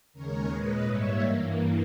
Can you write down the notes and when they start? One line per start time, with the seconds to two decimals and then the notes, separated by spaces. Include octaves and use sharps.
0.13 D#2 C#3 G#3 A#4 C#5
0.49 A#2 G#3 B4 D#5
0.85 G#2 G3 A#3 C#5 E5
1.21 G2 E3 A#3